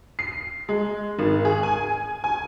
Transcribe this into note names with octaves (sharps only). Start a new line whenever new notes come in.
C7
G#3
G#1
G#4
G#5
G#5